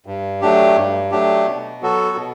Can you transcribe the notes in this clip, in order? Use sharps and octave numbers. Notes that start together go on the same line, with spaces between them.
G2
F#3 A3 D4 G4
G2
F#3 A3 D4 G4
B2
F#3 B3 F#4 A4
B2